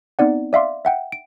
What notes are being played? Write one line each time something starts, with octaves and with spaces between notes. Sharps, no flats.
B3 C4 D#4 D5 F#5
D5 E5 F5 C6 D6
E5 F#5 G5
D7